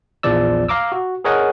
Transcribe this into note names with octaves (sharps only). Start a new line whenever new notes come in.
A#1 E2 F3 D5 E6
F5 A#5 D6 E6
F#4
G#4 A#4 C#5 D#5 F#5 G#5